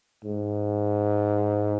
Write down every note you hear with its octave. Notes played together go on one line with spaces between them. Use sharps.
G#2